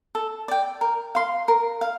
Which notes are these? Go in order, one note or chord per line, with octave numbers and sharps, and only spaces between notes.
A4
D5 G5
A#4
F5 C6
A#4
F5